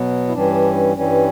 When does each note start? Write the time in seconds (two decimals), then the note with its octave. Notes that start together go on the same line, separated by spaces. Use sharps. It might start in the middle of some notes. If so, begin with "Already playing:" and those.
Already playing: B2 F#3 B3
0.28 E4
0.33 G2 E3 G3 C#4 D4
0.97 G2 E3 G3 C#4